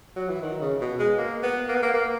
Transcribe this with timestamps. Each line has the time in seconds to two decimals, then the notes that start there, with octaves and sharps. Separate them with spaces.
0.16 F#3
0.29 E3
0.42 D#3
0.61 C#3
0.81 B2
1.00 G#3
1.18 A#3
1.43 B3
1.69 A#3
1.75 B3
1.83 A#3
1.94 A#3